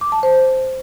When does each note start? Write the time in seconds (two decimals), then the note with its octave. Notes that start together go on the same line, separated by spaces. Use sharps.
0.01 D6
0.12 A5
0.23 C5